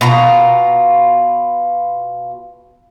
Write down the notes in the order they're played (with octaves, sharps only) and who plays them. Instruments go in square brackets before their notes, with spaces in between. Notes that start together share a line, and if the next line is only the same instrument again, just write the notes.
[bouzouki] B2 F4 A#5